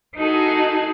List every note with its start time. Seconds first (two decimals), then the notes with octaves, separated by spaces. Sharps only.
0.16 D#4 E4 F#4 G#4 A4